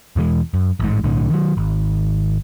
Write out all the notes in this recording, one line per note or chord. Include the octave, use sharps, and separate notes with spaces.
E2 B2 E3 G#3
F#2
A1 G#2
B1 A2 D3
D#3 F#3
G#1